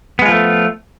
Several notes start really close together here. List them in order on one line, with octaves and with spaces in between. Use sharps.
B3 G#3 F4 F3 A3